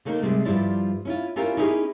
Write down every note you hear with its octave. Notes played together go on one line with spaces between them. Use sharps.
D3 A3 A#3 D#4
C3 G3 G#3 D4
G2 F3 G3 E4 F4 D5
C#4 E4 F4
C#4 D4 E4 F4 G4 A#4
C#4 D#4 E4 G4 G#4